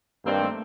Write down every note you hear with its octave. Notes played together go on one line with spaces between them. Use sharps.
G2 D#3 G3 A#3 C4
A3